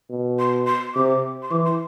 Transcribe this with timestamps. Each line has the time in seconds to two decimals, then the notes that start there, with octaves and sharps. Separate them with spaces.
0.10 B2
0.39 C6
0.67 C6
0.94 C3 D6
1.42 C6
1.51 E3 D6
1.65 C6